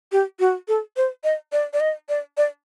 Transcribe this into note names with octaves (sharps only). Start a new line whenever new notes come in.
G4
F#4
A4
C5
D#5
D5
D5
D#5
D5
D5